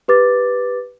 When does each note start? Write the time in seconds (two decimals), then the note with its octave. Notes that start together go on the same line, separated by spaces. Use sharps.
0.08 G4 B4 D6 A6